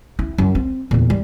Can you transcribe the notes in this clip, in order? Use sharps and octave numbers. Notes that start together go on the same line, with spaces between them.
E4
F#2
C4
E2 A#2
G3